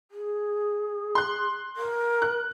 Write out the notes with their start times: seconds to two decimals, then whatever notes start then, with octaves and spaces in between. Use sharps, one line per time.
0.11 G#4
1.15 C6 F#6
1.77 A#4
2.22 F#6